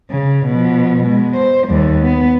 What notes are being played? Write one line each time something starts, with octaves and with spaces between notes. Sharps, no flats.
C#3
B2 F3
B2 G#3
C5
D#2 G3
B3